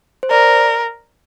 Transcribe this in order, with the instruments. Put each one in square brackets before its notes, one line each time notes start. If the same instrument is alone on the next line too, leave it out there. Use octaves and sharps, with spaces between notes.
[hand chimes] C5
[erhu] A#4 [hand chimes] D5